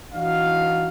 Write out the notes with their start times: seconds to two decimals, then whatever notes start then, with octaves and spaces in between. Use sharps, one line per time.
0.13 E3 D4 D#4 F#4 F5